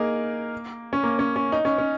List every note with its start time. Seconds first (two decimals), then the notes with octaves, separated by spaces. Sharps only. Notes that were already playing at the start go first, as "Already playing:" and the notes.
Already playing: A#3 D#4 G#4 A#4
0.93 C#4
1.03 A#3
1.19 C#4
1.36 C#4
1.52 D#4
1.65 C#4
1.78 C#4